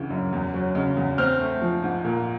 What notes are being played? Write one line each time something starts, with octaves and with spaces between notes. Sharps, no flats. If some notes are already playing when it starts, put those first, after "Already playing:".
Already playing: D2 C#3 E3
F#2
E2
F#3
C#3
E2
C4 F6 G6
A3
F3
G#2
A#2